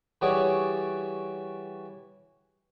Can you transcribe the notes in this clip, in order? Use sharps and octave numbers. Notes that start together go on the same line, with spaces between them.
E3 G3 F#4 G#4 C#5 D5